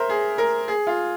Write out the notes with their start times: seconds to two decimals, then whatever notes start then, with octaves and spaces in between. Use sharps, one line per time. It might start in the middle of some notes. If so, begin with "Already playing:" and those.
Already playing: A#4 C5 E5
0.09 G#4
0.38 A#4
0.68 G#4
0.87 F4